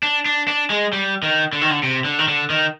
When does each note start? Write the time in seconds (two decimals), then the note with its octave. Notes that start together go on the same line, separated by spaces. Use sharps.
0.03 D4
0.26 D4
0.48 D4
0.70 G#3
0.93 G3
1.23 D#3
1.53 D3
1.61 D#3
1.71 D3
1.83 C3
2.05 D3
2.19 D#3
2.28 D3
2.50 D#3